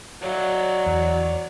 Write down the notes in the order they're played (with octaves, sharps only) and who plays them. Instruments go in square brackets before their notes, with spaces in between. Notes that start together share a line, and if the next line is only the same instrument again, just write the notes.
[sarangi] F#3 [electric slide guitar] C#5 D5 F5
[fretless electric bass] E2